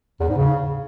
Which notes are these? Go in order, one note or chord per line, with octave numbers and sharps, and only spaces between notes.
E2
G#2
C#3